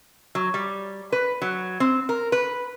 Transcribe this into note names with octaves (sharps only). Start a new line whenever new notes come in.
F#3
G3
B4
F#3
C4
A#4
B4